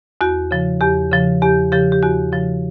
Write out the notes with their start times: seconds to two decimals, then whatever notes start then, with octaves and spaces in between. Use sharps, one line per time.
0.21 E2 F#4
0.51 C#3 F3
0.81 E2 G4
1.11 C#3 F3
1.42 E2 G4
1.72 C#3 F3 G4
1.92 G4
2.02 E2 F#4
2.32 C#3 F3